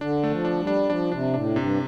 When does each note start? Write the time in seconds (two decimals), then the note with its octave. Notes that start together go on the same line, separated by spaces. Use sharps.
0.01 D3 D4
0.24 A3
0.30 F3
0.45 D4
0.60 G3
0.67 D4
0.89 F3 D4
1.12 C3 D4
1.34 A2 D4
1.56 G2 C3